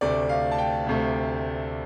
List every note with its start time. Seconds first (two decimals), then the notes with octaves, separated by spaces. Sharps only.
0.01 D2 C3 A3 D5
0.29 F5
0.52 A5
0.58 G5
0.87 D2 C3 A3